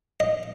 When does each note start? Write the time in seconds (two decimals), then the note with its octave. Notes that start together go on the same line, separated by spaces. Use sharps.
0.20 D#5